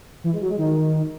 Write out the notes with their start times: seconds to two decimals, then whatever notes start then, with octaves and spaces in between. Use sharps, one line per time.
0.24 E3
0.32 G#3
0.41 F#3
0.49 G#3
0.58 D#3